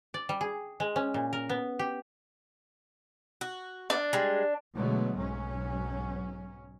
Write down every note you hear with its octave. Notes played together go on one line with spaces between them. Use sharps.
D5
G3
G#4
G#3
C#4
A#2
A#4
B3
G4
F#4
D4
G3 G#3
B2 D3 F#3 G#3 A3 B3
B1 G#2 F#3 C#4